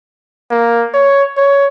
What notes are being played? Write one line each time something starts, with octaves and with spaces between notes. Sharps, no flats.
A#3
C#5
C#5